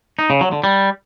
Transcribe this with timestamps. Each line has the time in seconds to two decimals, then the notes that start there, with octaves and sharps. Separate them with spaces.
0.19 D#4
0.30 C#3
0.41 F#3
0.52 D3
0.64 G3